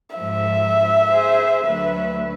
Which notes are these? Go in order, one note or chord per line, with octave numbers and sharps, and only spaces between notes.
G#2 F3 E5
G#4 C5
D2 F#3 B4